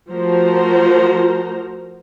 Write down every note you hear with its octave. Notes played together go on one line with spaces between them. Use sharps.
F3 A3 F#4 A#4 C5 A#5